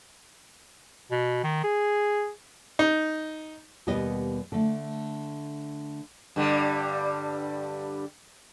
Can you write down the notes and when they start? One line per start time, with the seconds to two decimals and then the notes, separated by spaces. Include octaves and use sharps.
1.11 B2
1.44 D#3
1.64 G#4
2.79 D#4
3.87 D#2 B2 G3 B3 D#5
4.52 D3 A3
6.36 G2 D3 G3